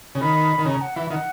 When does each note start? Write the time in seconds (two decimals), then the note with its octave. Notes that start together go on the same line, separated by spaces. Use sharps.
0.15 C#3
0.21 D#3 B5
0.59 D#3
0.65 C#3 A#5
0.81 F#5
0.96 E3 E5
1.10 D#3 F#5